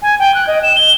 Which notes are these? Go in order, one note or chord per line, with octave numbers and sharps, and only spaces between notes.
G#5
G5
F#6
D#5
E7
G7